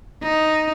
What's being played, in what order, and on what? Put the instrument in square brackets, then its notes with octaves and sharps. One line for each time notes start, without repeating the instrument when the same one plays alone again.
[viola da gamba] D#4